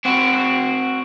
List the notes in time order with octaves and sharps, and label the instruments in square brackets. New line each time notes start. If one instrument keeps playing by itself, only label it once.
[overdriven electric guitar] C4 F#4